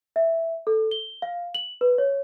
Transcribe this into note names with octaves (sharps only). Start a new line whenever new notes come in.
E5
A4
G7
F5
F#7
B4
C#5